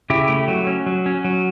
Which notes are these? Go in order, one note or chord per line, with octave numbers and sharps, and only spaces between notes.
C#3 E4 G4
A3
F#3
C#4
F#3
C#4
F#3